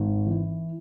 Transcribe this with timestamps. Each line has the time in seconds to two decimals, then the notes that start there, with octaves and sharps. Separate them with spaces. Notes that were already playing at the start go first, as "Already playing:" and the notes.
Already playing: G#1
0.26 E3